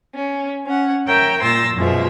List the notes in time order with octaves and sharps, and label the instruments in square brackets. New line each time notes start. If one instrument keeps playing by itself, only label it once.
[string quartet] C#4
C#4 F#5
A#4 C#5 E5 G5
A#2 C6 E6 A6 A#6
F#2 B2 F3 G#3 E5